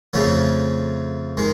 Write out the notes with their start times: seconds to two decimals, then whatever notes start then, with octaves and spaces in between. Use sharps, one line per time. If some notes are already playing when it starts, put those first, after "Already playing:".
0.13 F2 C#3 F3 A3
1.37 D#3 G#3